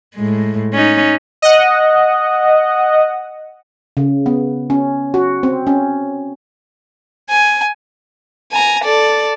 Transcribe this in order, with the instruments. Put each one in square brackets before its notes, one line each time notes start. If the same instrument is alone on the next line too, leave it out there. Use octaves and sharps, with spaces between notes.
[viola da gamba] A2 G#3
C#4 D#4
[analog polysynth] D#5 F#5
[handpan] C#3
B3
C#4
F#4
C4
C#4
[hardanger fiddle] G#5
[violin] G#5 A#5
A4 D5